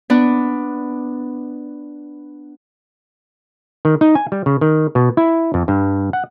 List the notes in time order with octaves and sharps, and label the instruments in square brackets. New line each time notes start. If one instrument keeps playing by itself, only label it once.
[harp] B3 D4
[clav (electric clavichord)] D#3
D#4
G#5
G3
C#3
D#3
B2
E4
F2
G2
F#5